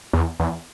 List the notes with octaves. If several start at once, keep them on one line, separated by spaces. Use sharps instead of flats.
E2
E2